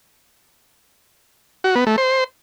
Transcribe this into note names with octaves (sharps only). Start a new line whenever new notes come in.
F#4
B3
A3
C5